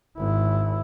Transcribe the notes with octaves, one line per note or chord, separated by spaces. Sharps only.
G#1 E4